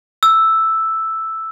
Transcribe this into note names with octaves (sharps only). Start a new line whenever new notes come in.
E6